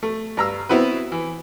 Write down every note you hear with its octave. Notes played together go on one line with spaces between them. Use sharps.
A3
G2 A#5 E6
B3 C4 E4 F#4 B4
E3